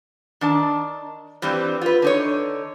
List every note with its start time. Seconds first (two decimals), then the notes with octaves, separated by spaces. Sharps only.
0.41 D#3 D4 A5
1.42 G2 E3 G3 C4
1.81 F4 B4
2.02 D3 D#4 C#5